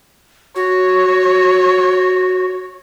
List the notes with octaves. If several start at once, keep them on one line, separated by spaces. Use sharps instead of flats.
F#4 C#5